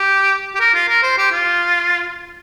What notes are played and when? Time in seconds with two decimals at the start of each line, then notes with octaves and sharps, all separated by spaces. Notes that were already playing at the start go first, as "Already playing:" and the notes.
Already playing: G4
0.55 G4
0.60 A#4
0.74 F4
0.89 A#4
1.03 C5
1.18 G4
1.32 F4